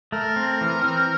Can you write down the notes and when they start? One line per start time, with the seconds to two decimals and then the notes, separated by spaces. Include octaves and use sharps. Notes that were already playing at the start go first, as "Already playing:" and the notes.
0.12 A3 A#4
0.36 C4
0.61 E3
0.84 C4